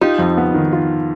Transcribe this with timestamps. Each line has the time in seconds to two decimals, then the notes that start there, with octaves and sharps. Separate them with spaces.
0.01 D#4 F4 G4
0.19 F2
0.37 B3
0.54 D#3
0.73 F4